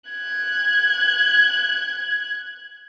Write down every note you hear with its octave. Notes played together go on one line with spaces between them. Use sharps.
F#6 G#6